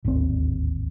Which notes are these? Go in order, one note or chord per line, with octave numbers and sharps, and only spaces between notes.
D1 G#1 D#2 C4